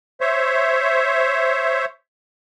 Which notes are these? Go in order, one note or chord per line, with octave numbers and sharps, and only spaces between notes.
C5 C#5 E5